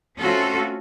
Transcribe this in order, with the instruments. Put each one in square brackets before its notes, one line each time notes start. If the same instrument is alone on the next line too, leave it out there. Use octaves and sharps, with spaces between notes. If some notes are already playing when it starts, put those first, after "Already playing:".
[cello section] A3 C4 C#4 F4 F#4 A4